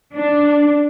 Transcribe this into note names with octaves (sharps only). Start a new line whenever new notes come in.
D4